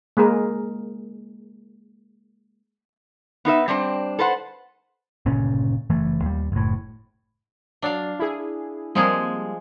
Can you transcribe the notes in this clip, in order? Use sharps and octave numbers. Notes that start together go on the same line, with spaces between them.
G#3 A#3 G#4 A#4
B3 D#4 B4 E5
G3 C4 D4 C5
A4 B4 C5 F#5
G1 A#2 C#3 C#4
F#1 E3 A3
D#2 G3
F#1 A2
F#3 D4 D5 F5
E4 G#4
F3 G3 G#3 A#3 C4 G#4